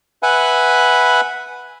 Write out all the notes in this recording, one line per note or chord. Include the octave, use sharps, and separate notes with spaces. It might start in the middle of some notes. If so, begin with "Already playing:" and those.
B4 E5 F#5 G#5 B5